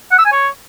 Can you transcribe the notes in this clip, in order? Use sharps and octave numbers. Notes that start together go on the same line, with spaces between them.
F#5
E6
G#5
C#5